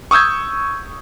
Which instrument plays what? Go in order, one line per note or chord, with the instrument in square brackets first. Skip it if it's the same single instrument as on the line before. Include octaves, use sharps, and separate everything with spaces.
[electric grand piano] C#6 D#6 E6 G6 G#6